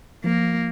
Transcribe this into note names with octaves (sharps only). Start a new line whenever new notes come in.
F3 A#3
F3